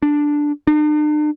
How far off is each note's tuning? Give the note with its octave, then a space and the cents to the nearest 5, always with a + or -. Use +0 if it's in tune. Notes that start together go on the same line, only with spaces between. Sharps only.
D4 +0
D4 +45